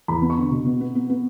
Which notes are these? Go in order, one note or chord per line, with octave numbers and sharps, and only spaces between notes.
E2 B5
B3
C#6
D3
B2
B3
B3
B3
B3